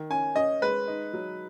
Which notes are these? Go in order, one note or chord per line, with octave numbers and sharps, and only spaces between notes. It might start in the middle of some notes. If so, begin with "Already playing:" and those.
Already playing: D#3
C#4 G#5
C#4 D#5
G#3 B4
D#4
F#3